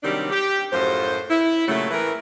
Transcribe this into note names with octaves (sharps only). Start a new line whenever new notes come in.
C3 D#3 F#3 G3 C4 D4
G4
F#2 A2 F3 C5
E4
A#2 C#3 F#3 A3
A2 E3 E4 A#4 B4